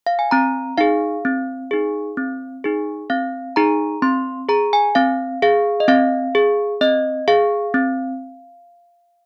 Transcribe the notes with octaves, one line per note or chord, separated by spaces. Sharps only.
F5
G#5
C4 A#5
D#4 G#4 F5
C4
D#4 G#4
C4
D#4 G#4
C4 F5
D#4 G#4 A#5
C4 C6
G#4 A#5
G#5
C4 F5
G#4 F5
D#5
C4 F5
G#4
C4 D#5
G#4 F5
C4